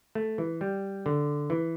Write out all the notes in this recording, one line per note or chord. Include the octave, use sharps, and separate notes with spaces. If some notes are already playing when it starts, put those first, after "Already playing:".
A3
E3
G3
D3
E3